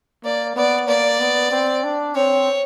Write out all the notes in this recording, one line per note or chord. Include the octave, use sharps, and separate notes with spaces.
A#3 D5
B3 D5
A#3 D5
B3
C4
D4
C4 C#5